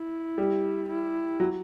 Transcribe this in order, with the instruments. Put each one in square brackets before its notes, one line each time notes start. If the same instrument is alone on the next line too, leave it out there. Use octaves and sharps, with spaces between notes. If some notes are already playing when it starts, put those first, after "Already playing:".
Already playing: [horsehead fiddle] E4
[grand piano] G3
[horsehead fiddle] E4
[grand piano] F#3